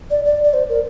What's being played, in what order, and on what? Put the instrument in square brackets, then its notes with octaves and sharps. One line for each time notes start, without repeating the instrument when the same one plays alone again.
[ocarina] D5
D5
D5
C5
A#4